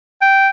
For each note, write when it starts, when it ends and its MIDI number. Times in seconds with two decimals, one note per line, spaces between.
0.22 0.49 79